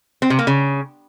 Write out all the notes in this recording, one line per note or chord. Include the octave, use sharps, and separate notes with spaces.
C4
C3
A#3
C#3